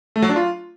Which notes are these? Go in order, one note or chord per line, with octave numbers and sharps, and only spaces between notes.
A3
F#3
D4
F4